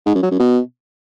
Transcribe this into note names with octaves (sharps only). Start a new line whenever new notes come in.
G#2
F#2
F#3
F#2
B2